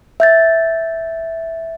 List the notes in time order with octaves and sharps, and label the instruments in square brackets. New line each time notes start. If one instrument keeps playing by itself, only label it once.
[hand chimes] E5 G6 A6